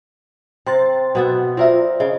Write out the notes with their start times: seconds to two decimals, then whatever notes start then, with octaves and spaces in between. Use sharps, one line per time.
0.66 C3 G5 C6 A6
1.15 B2 B3 E5
1.57 C4 F4 A#4 D5 E5
2.00 C#3 G#4 D#5